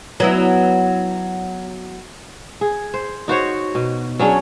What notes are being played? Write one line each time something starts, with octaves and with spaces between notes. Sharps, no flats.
F#3 B3 E4
G#4
C5
D#4 F#4 C5 C#5
B2
F#3 C#4 D4 G#4